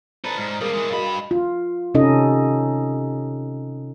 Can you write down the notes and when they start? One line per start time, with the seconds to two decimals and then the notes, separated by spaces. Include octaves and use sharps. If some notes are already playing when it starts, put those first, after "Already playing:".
0.25 A4 B4 C5 D5 A#5
0.37 G#2 F6
0.61 G3 A#3 G#4 A#4 D#6
0.73 E3 G#3
0.90 G2 F#4 D#5 F5 B5
1.07 G5
1.31 F4
1.95 C3 C#4 D#4 A4 D#5